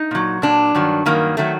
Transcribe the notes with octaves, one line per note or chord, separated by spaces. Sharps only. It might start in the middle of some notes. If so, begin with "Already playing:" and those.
Already playing: D#4
A#2 F#3
A#2 F#3 D4
G2 D#3 F#3
G2 D#3 F#3 A#3
D#3 F#3 A3